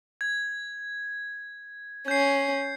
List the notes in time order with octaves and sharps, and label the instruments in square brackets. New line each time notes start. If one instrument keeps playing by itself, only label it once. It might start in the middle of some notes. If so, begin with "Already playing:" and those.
[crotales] G#6
[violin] C#4 [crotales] G6 C7